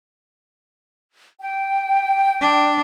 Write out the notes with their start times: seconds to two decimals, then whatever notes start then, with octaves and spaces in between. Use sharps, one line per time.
1.39 G5
2.41 D4